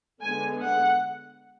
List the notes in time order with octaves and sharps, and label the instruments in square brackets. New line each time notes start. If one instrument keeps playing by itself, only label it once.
[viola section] D3 G#3 B3 G#5
F#5